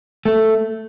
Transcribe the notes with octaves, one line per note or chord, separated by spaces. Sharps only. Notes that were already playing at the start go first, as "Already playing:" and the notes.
A3